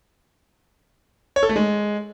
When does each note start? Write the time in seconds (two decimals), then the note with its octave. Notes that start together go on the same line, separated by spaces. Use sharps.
1.36 C#5
1.43 A4
1.49 A3
1.56 G#3